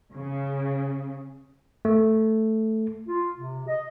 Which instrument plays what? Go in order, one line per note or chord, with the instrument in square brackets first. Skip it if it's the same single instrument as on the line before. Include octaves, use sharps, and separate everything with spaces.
[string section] C#3
[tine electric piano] A3
[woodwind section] F4
C3
D#5